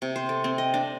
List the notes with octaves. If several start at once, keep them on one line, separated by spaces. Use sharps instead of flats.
C3
C5
A4
C4
D#5
D4